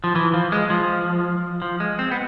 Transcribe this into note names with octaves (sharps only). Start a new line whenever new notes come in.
F3
E3
F3
G#3
F3
F3
G#3
C4
B3